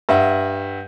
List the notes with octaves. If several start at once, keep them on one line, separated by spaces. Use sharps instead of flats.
G2 E5 F#5